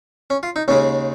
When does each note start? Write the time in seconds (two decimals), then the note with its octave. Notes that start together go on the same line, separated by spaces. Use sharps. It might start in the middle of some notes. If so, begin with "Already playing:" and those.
0.30 C#4
0.43 F4
0.56 D#4
0.68 D#2 C#3 G#3 C#4